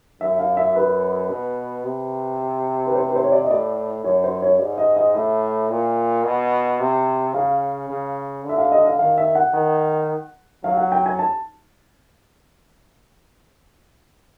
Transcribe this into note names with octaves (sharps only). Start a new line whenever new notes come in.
F#2 E5
F5
E5
B4
B2
C3
B4
C5
B4
C5
C#5
D5
D#5
A2 D5
F#2 C#5
C5
C#5
G#2 D5
D#5
D#5
A2 E5
A#2
B2
C3
C#3 F5
C#3
D3
E5
F5
D#5
F5
D#3 F5
E5
F#5
D#3
F#3 F5
F#5
G5
G#5
A5